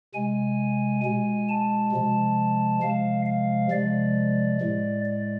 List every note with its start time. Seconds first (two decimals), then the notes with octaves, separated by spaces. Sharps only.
0.14 C3 G#3 G#5
1.04 B2 G#3 G#5
1.49 A5
1.92 C3 F3 G#3
2.82 C3 F3 G#3 F5
3.26 F5
3.71 C3 F3 G#3 D5
4.61 A2 G#3
5.05 D5